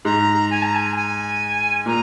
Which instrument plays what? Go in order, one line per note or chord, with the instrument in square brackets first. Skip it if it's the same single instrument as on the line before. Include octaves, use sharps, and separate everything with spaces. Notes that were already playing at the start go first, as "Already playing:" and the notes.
[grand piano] G#2 [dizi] A#5
[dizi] G#5
A#5
G#5
G#5
[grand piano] A#2 [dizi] A#5